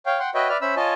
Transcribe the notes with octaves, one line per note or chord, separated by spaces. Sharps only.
C#5 F5 G5
F#5 G5 C6
F#4 B4 C#5 D#5 E5 G5
B4 D5 E5 F6
C#4 C5 E5 B5 E6
F4 C#5 D#5 G#5 A5